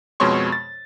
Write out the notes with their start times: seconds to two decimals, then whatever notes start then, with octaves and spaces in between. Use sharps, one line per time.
0.20 F2 B2 G#3 C#5 C6 C#6
0.52 A6